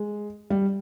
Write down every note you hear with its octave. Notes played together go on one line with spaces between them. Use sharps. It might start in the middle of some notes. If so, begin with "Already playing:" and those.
Already playing: G#3
G3